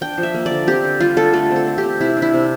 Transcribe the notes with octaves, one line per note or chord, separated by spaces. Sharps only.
D4 G5
F3
E5
A#3
D5
D3
C4 G4
D3
G3 F4
D3 A4
A3 A4
C4
A4
C4
G4
C4
C3 E4
D4
E4
C3